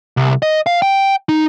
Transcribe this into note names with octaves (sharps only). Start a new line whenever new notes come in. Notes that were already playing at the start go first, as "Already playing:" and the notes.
C2
D#5
F5
G5
D#4